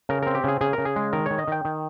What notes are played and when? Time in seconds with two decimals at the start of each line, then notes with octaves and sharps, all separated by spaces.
0.09 C#3 A#4
0.22 C4 A#4
0.35 G4
0.44 C#3 G#4
0.61 C#3 G#4
0.73 A#4
0.78 C#3
0.85 G#4
0.96 G#3
1.13 D#3 A#4
1.26 D#3 C#5
1.39 D#5
1.47 D#3 G5
1.65 D#3